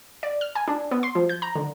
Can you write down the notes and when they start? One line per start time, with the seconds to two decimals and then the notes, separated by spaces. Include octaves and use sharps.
0.23 D5
0.41 F6
0.55 G#5
0.68 D4
0.91 B3
1.03 C6
1.15 F3
1.29 G6
1.42 A#5
1.56 D3